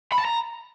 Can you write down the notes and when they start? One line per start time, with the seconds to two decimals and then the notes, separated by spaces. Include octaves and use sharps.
0.12 B5
0.19 A5
0.25 A#5